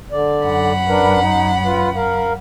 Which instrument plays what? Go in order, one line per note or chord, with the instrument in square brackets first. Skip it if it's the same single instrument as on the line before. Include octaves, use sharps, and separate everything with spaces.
[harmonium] D3 D5
[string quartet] F#2 F#5 B5
[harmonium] D4 A#4 B4
D#4
F4 B4
A#4 F5